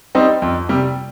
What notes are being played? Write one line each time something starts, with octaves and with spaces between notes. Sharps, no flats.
G3 C4 D#4
F2
C3 G3